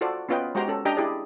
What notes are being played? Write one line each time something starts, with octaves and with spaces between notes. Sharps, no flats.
F4 F#4 A4 C5 D5
B3 C#4 F4 B4 D#5 G5
G#3 F#4 G4 C5 G5 A#5
C#4 A4
D4 G4 D#5 G5 A#5
E4 G4 G#4 D5